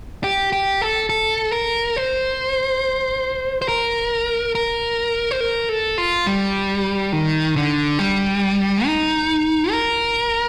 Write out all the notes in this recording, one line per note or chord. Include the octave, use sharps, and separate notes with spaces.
G4
G4
A4
A4
A#4
C5
C5
A#4
A#4
C5
A#4
A4
F4
G3
D#3
D3
G3
D#4
A#4